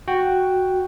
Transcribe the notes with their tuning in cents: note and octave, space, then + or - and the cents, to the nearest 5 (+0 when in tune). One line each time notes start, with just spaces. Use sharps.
F#4 +0 G5 +0